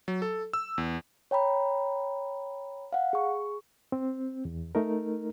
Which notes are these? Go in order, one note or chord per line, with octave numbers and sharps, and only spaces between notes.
F#3
A4
E6
E2
C#5 G5 A#5 B5
F5 F#5
G#4 C#6
C4
E2
A3 D#4 A#4